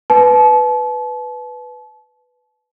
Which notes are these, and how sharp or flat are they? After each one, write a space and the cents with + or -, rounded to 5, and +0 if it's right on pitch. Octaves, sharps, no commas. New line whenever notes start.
B4 +0 A5 -35